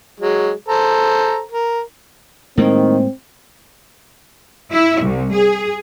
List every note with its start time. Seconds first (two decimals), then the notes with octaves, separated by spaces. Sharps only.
0.20 F#3 G#3
0.68 A4 C5 A#5
1.51 A#4
2.58 A2 D#3 G#3 A#3 C4
4.72 E4
5.03 C2
5.36 G#4